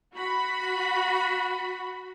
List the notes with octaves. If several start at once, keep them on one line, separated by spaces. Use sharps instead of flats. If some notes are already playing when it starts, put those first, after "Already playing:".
F#4 B5